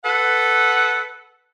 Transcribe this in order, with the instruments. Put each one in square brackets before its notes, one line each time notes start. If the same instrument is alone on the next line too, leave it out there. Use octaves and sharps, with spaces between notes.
[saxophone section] A4 B4 F#5